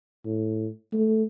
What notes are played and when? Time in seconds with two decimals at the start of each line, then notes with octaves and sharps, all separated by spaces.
0.25 A2
0.92 A3